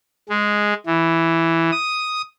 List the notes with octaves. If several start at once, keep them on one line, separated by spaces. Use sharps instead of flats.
G#3
E3
D#6